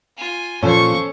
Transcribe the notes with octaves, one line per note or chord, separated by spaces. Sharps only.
F4 G#5
A#2 F3 C#4 A4 C5 C#6